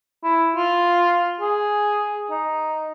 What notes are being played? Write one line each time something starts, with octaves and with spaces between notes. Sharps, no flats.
E4
F4
G#4
D#4